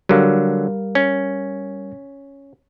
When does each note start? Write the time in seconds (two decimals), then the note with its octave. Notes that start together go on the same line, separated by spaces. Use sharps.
0.09 D3 F#3 G3 A#4 F5
0.95 C#4